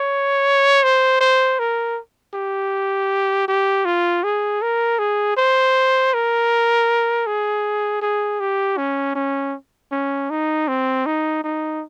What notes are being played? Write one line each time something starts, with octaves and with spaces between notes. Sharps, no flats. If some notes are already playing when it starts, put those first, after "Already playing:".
Already playing: C#5
C5
C5
A#4
G4
G4
F4
G#4
A#4
G#4
C5
A#4
G#4
G#4
G4
C#4
C#4
C#4
D#4
C4
D#4
D#4